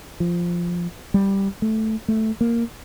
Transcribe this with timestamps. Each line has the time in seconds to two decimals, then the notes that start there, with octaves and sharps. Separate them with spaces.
0.20 F3
1.14 G3
1.62 A3
2.08 A3
2.41 A#3